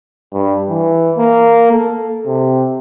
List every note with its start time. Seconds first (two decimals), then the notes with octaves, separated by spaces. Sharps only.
0.33 G2
0.70 E3
1.18 A#3
1.71 A4
2.26 C3